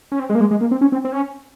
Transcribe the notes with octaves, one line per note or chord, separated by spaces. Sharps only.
C#4
C4
G#3
A#3
G#3
G#3
A#3
C4
C#4
C4
C4
C#4